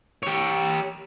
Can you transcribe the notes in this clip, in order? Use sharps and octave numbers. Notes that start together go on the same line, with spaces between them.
G4 C#5